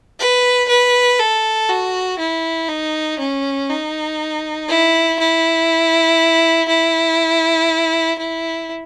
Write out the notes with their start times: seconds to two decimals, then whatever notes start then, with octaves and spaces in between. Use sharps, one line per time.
0.20 B4
0.69 B4
1.19 A4
1.69 F#4
2.19 E4
2.68 D#4
3.19 C#4
3.69 D#4
4.69 E4
5.19 E4
6.69 E4
8.19 E4